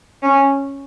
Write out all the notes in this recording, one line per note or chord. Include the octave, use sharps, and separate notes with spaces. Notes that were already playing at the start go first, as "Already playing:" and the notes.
C#4